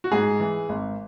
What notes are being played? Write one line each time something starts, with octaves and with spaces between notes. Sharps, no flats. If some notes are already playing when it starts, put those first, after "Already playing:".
F#4
G#2 G#4
E3
G#1